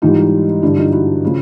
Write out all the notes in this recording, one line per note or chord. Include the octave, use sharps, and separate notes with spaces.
G#2 E3 G3 D#4 F4
G2 D3 G3 D4 E4
D#4 F4
E4 F#4
C#3 F3